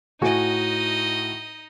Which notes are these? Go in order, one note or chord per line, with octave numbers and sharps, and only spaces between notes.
A2 D#4 F#4 D#5 G#5